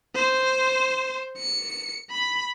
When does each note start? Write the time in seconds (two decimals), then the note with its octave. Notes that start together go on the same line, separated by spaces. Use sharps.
0.15 C5
1.37 C#7
2.10 B5